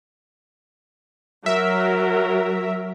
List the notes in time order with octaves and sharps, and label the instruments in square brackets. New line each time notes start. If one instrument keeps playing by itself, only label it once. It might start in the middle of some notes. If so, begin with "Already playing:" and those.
[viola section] F#3 A#4 [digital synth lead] E5